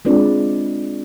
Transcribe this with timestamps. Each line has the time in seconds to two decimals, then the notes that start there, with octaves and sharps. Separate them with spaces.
0.05 G#3 C4 D4 F4 B4 D5